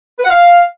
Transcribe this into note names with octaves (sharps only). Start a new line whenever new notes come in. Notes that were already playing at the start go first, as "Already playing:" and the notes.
B4
F#5
F5